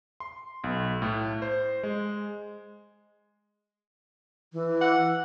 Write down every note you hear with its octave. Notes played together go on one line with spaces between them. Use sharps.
C6
B1
A2
C5
G#3
E3
F#5